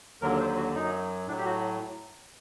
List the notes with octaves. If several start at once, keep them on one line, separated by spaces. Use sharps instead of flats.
D#2 D3 F#3 A#4
C5
F#4
F#2 F#3 D#4
A2 F#3 D4
G4
F#4